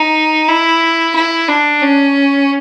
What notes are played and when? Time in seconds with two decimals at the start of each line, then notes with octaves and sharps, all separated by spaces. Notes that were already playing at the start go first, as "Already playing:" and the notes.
Already playing: D#4
0.48 E4
1.15 E4
1.48 D4
1.82 C#4